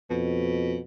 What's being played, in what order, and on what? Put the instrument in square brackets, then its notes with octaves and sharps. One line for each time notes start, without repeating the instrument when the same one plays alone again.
[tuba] F2 [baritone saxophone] B2